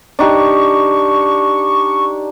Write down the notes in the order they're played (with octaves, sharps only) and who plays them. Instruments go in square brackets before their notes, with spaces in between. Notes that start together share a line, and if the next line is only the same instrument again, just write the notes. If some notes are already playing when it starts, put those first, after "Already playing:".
[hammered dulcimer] D4 D#4 G4 [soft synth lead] C#6